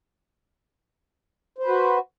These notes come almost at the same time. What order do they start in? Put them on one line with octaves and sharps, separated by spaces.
C5 B4 F#4